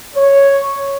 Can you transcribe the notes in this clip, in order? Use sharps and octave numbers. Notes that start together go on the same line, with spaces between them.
C#5